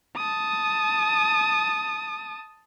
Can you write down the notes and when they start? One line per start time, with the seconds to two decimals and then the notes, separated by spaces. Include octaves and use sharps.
0.17 A5 D#6